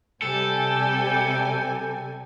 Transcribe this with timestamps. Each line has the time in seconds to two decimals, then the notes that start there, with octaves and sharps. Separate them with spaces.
0.22 C3 G3 A4 G5 G#5